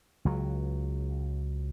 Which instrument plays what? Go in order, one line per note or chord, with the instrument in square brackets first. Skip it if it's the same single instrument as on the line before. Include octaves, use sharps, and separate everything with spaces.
[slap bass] C#2 F#3